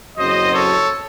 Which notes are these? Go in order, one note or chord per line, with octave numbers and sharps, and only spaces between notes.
F#1 F#2 C#3 F#3 C4 C5 D#5
A4 C#5